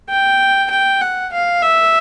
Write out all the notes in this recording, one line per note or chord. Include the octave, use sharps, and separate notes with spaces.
G5
G5
F#5
F5
E5